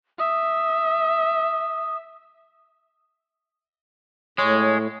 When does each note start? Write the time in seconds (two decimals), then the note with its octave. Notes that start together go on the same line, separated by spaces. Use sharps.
0.19 E5 D#6
4.38 A2 G#3 C#5